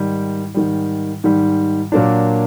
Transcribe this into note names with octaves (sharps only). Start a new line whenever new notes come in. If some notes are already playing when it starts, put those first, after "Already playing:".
Already playing: G#2 D#3 G3
G#2 D#3 G3
G#2 D#3 G3
A#2 F#3 A#3 D4